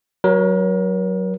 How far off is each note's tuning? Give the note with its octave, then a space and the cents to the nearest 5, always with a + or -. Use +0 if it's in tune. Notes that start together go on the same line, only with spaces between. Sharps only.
F#3 +10 A#4 +40